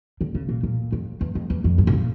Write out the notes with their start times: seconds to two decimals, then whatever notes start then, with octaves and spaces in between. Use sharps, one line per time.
0.21 D3
0.35 C#3
0.49 A#2
0.63 A#2
0.92 F2
1.21 E2
1.35 F2
1.50 E2
1.64 F2
1.78 G2
1.87 C#3
1.93 A#2